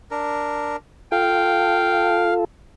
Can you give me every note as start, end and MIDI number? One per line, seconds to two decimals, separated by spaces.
0.11 0.76 62
0.11 0.76 70
1.12 2.45 65
1.12 2.45 69
1.12 2.34 77
1.12 2.34 79